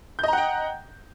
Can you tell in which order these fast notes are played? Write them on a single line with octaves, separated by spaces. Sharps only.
G6 D#5 A#5 F#5 G5